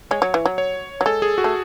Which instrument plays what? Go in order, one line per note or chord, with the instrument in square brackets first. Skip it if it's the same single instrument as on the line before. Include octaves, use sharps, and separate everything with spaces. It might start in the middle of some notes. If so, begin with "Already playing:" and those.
[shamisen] G#3 [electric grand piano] C#5
[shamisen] F#3
E3
F#3
[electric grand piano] C#5
[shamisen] F#3
[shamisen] G#3 [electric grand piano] A4
[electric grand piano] G#4
F#4
[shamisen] A3